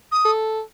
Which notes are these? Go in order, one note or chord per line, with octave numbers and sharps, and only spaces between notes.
D#6
A4